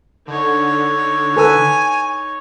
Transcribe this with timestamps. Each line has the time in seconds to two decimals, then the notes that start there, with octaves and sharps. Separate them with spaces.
0.27 D3 D#4 C#5
1.36 A4 B4 G#5 E6